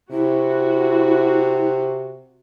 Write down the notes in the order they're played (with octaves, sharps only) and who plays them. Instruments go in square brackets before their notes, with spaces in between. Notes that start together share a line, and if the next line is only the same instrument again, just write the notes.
[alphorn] C3 [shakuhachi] E4 [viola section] F#4